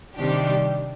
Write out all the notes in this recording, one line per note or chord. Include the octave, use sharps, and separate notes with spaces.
C3 D#3 G3 D4 G4